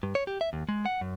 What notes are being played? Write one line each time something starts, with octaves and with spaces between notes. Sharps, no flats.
G2
C#5
G4
E5
D#2
G#3
F#5
F#2